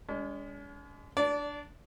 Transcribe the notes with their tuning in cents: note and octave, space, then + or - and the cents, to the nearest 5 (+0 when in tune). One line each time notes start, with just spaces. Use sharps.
G#3 -25 C#4 +45
D4 +0 D5 -25